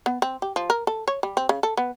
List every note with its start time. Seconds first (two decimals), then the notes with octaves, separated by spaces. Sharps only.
0.06 B3
0.22 C4
0.42 G4
0.56 F3
0.70 A#4
0.87 A4
1.08 C#5
1.23 G3
1.37 C4
1.49 C#3
1.63 A4
1.77 B3